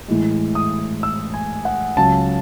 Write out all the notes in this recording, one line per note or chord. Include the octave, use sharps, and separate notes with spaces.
A2 E3 G#3
D#6
E6
G#5
F#5
C#2 C#3 F#3 A5